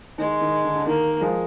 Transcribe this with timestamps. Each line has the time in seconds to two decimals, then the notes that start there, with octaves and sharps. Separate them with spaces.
0.18 D#3 G#3
0.41 D#3
0.64 D3
0.75 D3
0.87 D#3 A#3
1.21 F3 G#3